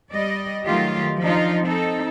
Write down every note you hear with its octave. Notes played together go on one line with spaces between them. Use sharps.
G3 D5 D#5
D#3 F#3 A3 F4 G4 D#5
F3 D4 D#4 F4
C4 D#4 A4